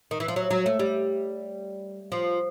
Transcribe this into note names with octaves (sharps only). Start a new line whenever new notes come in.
D#3
E3
F3
F#3
F#3
A3
G3
F3